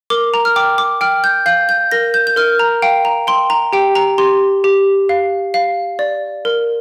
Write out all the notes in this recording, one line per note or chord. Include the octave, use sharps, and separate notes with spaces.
A#4 D6
A#5
F6
G5 D6
D6
G5 F6
G6
F5 G6
G6
A#4 A#6
G6
G6
A#4 F6
A#5
F5 G5
A#5
G5 C6
A#5
G4 G5
A#5
G4 C6
G4
F5
F5
D5
A#4